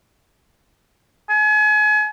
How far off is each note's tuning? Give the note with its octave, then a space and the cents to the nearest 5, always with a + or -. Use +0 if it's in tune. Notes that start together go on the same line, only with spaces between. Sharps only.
G#5 +35